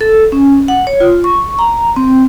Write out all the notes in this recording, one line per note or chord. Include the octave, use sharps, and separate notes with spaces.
A4
C#4
F#5
C#5
F4
C#6
A#5
C4